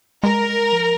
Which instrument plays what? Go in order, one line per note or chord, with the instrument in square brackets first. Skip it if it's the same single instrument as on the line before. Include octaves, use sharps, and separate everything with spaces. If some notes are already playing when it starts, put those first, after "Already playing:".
[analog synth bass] G#3 [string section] A#4
[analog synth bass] F3